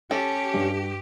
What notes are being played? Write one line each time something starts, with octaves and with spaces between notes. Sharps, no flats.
C#4 G4 A4
G2